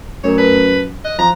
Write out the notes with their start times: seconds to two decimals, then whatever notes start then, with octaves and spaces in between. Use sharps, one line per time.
0.24 F#2 A3 D4 A#4 C#5
0.38 B4 A5
1.05 D#5 F#6
1.19 F3 A#5